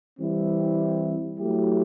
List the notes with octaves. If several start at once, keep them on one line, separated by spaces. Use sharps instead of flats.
E3 G3 C4 E4
F#3 A3 E4 G4